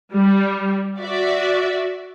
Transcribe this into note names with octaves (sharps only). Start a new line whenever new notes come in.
G3
F#4 D5 E5